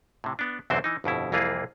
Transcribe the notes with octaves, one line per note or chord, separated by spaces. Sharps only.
A2 C3
B3 D4
B1 E2 D3 F#3 C4 C5
E3 D#4
G1 F2 B2 E4
C2 F2 E3 A#3 F4 G#4